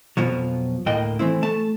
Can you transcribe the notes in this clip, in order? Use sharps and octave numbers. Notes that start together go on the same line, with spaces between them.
F2 B2 F3 F#3
D2 A2 A#3 D#5 G5
E3 A3 C4 E4
A3 A5